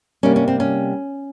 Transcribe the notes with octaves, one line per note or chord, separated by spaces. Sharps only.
C3 G3 A#3 C#4
C#4
C4
C#4